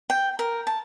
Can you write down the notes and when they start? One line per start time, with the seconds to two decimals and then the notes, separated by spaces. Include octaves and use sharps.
0.10 G5
0.39 A#4
0.67 A5